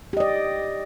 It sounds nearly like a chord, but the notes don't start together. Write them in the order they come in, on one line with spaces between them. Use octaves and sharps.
G4 D#5 D5